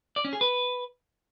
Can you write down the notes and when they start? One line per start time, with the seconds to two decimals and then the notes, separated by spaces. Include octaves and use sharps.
0.16 D5
0.25 C#4
0.33 G#4
0.41 B4